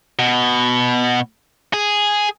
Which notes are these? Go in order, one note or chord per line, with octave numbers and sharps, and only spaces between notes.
B2
G#4